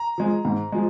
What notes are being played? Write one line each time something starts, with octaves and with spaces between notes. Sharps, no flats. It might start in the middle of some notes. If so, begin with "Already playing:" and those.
Already playing: A#5
F3 G#3
G#2
F3 G#3